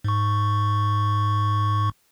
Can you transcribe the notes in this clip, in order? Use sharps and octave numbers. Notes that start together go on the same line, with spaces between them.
G#2 C#6